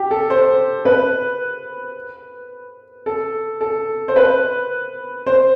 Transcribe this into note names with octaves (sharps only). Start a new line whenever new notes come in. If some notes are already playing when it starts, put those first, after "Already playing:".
Already playing: G4
A4
C5
B4
A4
A4
C5
B4
C5